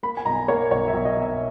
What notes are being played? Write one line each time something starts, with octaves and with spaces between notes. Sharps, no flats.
A#3 B5
G#5
B1 A#5
A#3 C#5
B1 C#5
E5
B1
D#5
B1
E5